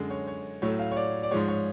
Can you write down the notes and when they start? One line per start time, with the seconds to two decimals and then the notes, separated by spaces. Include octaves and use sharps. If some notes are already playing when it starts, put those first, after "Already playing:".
Already playing: F#2 D3 G#3
0.10 C#5
0.27 C#5
0.62 A2 F#3 A3 C#5
0.79 F5
0.92 C#5
0.96 D5
1.23 D5
1.31 G#2 F3 G#3 C#5
1.48 C#5